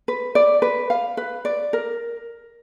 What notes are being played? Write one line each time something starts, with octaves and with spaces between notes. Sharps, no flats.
B4
D5
B4
F5
B4
D5
A#4